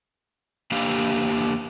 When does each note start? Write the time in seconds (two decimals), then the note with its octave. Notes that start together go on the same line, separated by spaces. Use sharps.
0.71 E2 A#3 D4 G4 F5